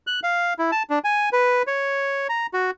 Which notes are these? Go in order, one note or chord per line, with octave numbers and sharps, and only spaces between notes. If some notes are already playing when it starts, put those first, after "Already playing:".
F#6
F5
E4
A5
D4
G#5
B4
C#5
A#5
F#4